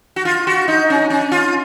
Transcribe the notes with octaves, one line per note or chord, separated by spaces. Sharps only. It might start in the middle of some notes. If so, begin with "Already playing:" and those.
F#4
F4
F#4
D#4
C#4
C#4
F4